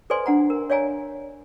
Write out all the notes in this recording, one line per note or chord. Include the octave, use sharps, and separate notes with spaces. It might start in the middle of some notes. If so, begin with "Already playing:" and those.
A4 B4 C5 D5 G#5 C6
D4 F#5 A#5
A#4
C#5 D5 F5 G#5 A#5